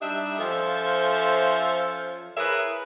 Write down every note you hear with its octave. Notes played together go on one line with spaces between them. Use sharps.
G3 D4 D#4 G4 E5
F3 C#4 A4 C5 E5 F5
E4 G#4 A#4 B4 C#5 E5